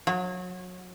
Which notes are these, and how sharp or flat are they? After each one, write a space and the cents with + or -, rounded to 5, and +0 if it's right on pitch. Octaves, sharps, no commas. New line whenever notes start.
F#3 -30